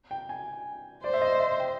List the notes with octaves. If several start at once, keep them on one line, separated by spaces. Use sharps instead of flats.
G5
G#5
C5 D5
E5
D#5
E5
G5